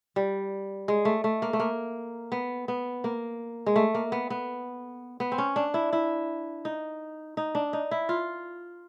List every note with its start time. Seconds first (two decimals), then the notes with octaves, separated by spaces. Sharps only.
0.16 G3
0.88 G#3
1.05 A3
1.24 A3
1.42 A#3
1.53 A3
1.60 A#3
2.32 B3
2.68 B3
3.04 A#3
3.66 G#3
3.76 A3
3.95 A#3
4.12 B3
4.30 B3
5.20 B3
5.32 C4
5.38 C#4
5.56 D4
5.74 E4
5.93 E4
6.65 D#4
7.37 D#4
7.55 D4
7.73 D#4
7.91 E4
8.09 F4